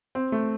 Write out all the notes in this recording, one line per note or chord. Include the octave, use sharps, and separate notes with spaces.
C4
A3